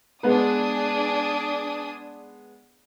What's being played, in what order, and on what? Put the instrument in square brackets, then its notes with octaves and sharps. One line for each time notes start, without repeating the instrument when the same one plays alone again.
[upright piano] G#3 B3 B4 [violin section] D4 G#4 D#6